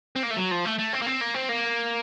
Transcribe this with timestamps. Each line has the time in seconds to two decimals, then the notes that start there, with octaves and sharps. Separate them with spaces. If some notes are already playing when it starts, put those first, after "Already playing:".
0.16 C4
0.23 A#3
0.31 A3
0.37 F#3
0.51 F3
0.66 A3
0.79 A3
0.93 C4
1.02 A#3
1.06 C4
1.21 A#3
1.34 C4
1.49 A#3